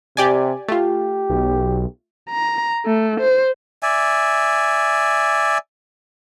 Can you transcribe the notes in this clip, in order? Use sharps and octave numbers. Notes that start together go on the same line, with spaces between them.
C3 G4 D5 G#5
A3 F4 G4
B1
A#5
A3
C5
D5 E5 G#5